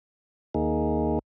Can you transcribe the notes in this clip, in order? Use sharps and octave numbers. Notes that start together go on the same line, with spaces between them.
D#2 A#3 D#4 G#4